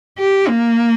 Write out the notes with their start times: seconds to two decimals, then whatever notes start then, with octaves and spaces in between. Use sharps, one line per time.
0.19 G4
0.48 A#3